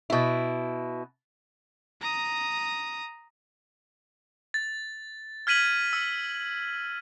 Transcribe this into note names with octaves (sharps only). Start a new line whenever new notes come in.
B2 E4
A#5 D#6
A6
F6 G#6 B6 D#7 F#7
E6